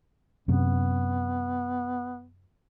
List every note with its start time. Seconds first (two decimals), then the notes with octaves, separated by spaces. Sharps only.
0.48 F#2 C3 B3